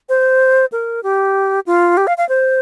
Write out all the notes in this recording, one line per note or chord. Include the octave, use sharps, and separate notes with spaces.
C5
A#4
G4
F4
G4
F5
F5
C5